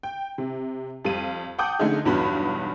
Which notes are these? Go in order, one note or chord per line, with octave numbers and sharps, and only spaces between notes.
G5
C3
F2 G3 F5 D#7
F#5 G5 A5 D6 D#6 G6
D3 F3 A3 C#4 D#4 G#4
B1 E2 G2 B3 F#4 B5